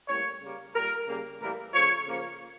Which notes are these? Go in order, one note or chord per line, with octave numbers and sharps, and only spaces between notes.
A2 G3 A#3 C#5
C#3 G3 A#3
A#2 G3 A#3 A#4
C#3 G3 A#3
A2 E3 G3 A#3 A#4
C#3 F3 A3 C#5
C#3 F3 A#3